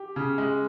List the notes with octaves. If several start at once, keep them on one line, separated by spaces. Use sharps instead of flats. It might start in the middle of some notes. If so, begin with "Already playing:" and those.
Already playing: G4
C#3
G#3